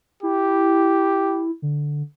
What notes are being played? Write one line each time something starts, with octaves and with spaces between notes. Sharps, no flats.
E4 G4
D3